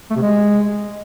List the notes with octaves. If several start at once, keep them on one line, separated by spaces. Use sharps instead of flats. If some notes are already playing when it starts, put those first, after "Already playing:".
A3
C3
G#3